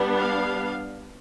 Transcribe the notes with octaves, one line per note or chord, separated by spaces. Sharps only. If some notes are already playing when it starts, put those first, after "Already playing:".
Already playing: G3 B3 D4
F5